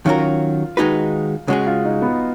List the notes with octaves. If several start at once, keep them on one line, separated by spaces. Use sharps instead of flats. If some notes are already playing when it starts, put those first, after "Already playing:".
D#3 F#3 C#4 F4 F#4 A#4
D#3 G#3 D#4 F#4 B4
C#3 G#3 C#4 F#4 G#4
F4
D#4
B3